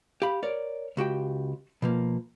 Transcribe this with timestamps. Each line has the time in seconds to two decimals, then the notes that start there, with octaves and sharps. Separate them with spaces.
0.22 G4 F5 B5
0.43 A#4 C#5 D5
0.97 C#2 F#4 G4 G5
1.82 B2 F3 A#3